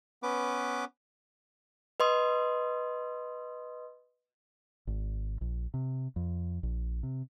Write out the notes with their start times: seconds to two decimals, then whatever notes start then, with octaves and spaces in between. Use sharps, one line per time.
0.23 B3 C#4 B4 D6
2.00 B4 D#5 C6 D#6
4.87 G#1
5.41 A#1
5.74 C3
6.16 F2
6.63 A#1
7.03 C3